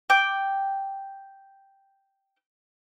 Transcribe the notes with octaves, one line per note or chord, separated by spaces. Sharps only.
G5 D6